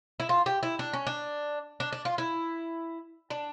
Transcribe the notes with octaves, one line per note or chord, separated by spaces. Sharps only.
E4
F4
G4
E4
D4
C#4
D4
D4
D4
F4
E4
D4